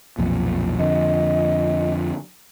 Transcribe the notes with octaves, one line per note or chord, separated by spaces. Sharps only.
B1 F2 A#2
F2 D3 D#5